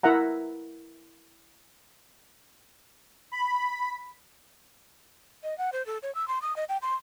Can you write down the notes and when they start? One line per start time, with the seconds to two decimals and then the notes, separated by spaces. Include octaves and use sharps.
0.03 E4 A#4 E5 F#5 A#5
3.32 B5
5.44 D#5
5.58 F#5
5.73 C5
5.86 A4
6.03 C#5
6.15 E6
6.28 C6
6.42 D#6
6.56 D#5
6.69 G5
6.82 C6